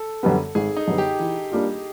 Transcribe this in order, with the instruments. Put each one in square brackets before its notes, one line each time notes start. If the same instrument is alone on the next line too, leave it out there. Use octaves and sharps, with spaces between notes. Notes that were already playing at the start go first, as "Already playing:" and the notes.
Already playing: [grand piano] A4
[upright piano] F#2 D3 G3 B3
[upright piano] G#1 [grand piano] G#4
[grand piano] D#4
[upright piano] F#2 D3 G3 B3
[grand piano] G4
[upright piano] E3
G3 A#3 D4 F4